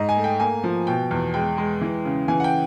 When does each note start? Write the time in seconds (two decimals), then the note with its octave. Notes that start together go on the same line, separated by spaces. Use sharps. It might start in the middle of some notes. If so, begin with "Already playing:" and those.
Already playing: G#2 D#5
0.09 G#5
0.16 A3
0.24 G5
0.40 A#3 G#5
0.64 F3
0.87 B2 G5
1.11 E2
1.34 G#3 G5
1.58 G#3
1.81 E3
2.05 C#3
2.28 E3 G#5
2.40 F#5
2.44 G5